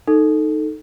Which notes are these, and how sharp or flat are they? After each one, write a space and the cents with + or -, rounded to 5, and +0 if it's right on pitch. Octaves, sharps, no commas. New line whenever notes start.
D#4 -5 A4 +0